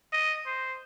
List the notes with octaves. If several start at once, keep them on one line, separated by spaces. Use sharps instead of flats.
D#5
C5